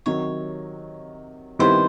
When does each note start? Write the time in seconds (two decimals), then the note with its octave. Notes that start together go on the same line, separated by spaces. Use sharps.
0.06 C3 D#3 F#3 C#5
1.59 C3 D#3 G3 B3 E4 C5